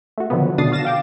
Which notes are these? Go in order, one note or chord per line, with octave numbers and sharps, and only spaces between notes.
A3 F#4
D3 D#3 F3 F#3 B3
B2 D3 D4 D#6 A6 C7
F#4 F5 A6 A#6 E7
F5 G5 D6